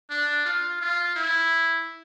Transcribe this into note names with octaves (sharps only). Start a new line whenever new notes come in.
D4
F4
F4
E4